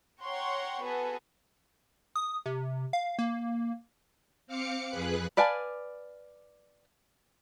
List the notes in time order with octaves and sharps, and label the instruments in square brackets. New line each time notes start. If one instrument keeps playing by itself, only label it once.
[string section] C#5 F#5 G5 A#5 C6 C#6
B3 F#4 G#4 A4 B4
[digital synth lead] D#6
C3
F5
A#3
[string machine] C4 F5 D6 C#7
F2 G#4 B4 F#6
[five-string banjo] B4 D5 F5 G#5 A5